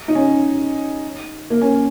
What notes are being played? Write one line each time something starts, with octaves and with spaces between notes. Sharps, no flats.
D#4
C#4
A#3
C#4